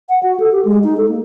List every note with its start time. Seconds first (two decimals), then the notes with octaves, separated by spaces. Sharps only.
0.09 F#5
0.23 F#4
0.40 A4
0.52 G4
0.65 G#3
0.84 D#4
0.97 A4
1.08 A#3